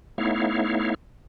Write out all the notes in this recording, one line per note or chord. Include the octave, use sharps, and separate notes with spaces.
A3 B3 D#4 E4 C#5 F5